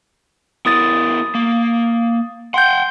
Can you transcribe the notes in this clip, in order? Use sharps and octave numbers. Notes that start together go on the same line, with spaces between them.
B3 E4 A#4 D#6 A6
A#3
F#5 G5 C6 G6